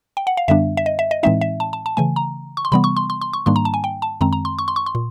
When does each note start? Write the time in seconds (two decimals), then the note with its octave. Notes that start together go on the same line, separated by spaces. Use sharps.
0.17 G5
0.27 F#5
0.37 F5
0.48 F#2 D3 G3 B3 D4 E5
0.77 E5
0.86 D#5
0.99 E5
1.11 D#5
1.23 A2 E3 G#3 C4 D#4 E5
1.41 E5
1.60 A5
1.73 A5
1.86 A5
1.97 C#3 E3 A3 G#5
2.16 A#5
2.57 C#6
2.65 C6
2.72 C3 E3 G3 B3 B5
2.84 C#6
2.97 C6
3.10 C6
3.21 C6
3.33 C#6
3.46 G#2 D#3 G3 A#3 D4 C6
3.56 A#5
3.65 A5
3.74 G#5
3.84 G5
4.02 A5
4.21 F#2 D#3 G#3 C4 A#5
4.33 A#5
4.45 C6
4.59 C#6
4.68 C6
4.76 C#6
4.86 C6
4.95 A#2